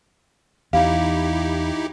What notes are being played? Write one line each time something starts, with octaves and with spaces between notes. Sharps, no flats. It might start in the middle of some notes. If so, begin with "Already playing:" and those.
E2 D#4 E4 G4 F5